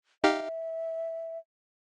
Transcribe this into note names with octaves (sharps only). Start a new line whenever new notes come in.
D#4 G4 E5 F5